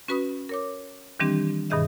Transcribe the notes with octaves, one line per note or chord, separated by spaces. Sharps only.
C#4 F#4 B4 B5 D#6
A#4 C#5 D6
D#3 E3 G3 C4 D4 G4
G2 B2 D#3 G#4 D#5 E5